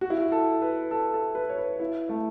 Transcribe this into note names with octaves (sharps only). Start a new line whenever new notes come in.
F#4
E4
F#4
A4
B4
A4
A4
B4
C#5
B4
E4
A3